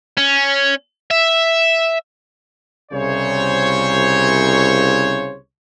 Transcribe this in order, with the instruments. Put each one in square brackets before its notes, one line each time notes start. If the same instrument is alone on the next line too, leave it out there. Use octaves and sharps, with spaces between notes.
[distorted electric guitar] C#4
E5
[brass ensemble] C2 C#3 C5 C#5